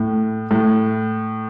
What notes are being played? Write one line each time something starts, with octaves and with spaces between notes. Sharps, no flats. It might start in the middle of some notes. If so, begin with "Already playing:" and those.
Already playing: A2
A2